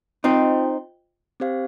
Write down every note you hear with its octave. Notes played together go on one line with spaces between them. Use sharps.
C4 D#4 F4 C5 D#5 G5
C4 G4 C5 F5